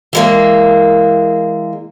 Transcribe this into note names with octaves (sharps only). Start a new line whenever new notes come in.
E3 G#3 A#3